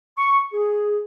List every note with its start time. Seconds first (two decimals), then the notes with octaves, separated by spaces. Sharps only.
0.18 C#6
0.53 G#4